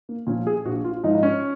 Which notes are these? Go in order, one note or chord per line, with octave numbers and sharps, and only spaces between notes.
A#3
A#2 F3 C#4
G#4
A#1 F#4
F4
G#2 F3 D#4
D#4
C#4